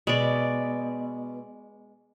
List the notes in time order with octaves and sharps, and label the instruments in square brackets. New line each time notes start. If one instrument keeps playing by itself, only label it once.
[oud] B2 [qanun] G#3 D5